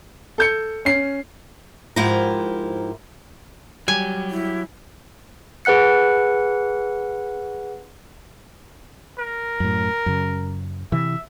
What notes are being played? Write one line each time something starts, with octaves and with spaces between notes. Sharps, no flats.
A4 G6 C#7
C#4 C7
G#2 F3 E4 G4 A#4 A#5
F#3 G3 G4 G#5
E4
G#4 B4 F#5 F#6 C#7
A#4
F#2 A2
F#2 C#3
C3 E3 E5